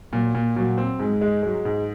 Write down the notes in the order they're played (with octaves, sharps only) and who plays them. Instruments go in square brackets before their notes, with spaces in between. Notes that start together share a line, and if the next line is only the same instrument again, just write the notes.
[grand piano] A#2 [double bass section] F#3
[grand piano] A#2
[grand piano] A#2 [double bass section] F#3
[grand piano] C4
[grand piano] G#2 [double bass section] G#3
[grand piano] G#3
[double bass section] F#3 [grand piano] G#3
[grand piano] G#2